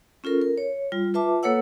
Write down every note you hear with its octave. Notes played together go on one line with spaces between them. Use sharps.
C#4 F4 A4 A#4
A#4
C#5
G3 F4
F4 B4 E5 A5 D6
A#3 A4 B4 C#5 F#5 E6